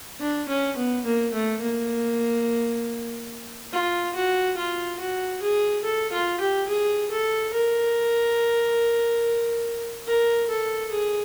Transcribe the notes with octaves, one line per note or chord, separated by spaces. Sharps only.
D4
C#4
B3
A#3
A3
A#3
F4
F#4
F4
F#4
G#4
A4
F4
G4
G#4
A4
A#4
A#4
A4
G#4